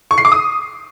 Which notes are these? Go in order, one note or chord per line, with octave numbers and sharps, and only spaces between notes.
C#6
C7
D6
D#6